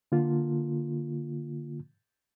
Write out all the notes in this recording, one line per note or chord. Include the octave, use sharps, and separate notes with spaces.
D3 A#3 F4